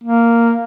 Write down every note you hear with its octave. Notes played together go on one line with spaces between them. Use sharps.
A#3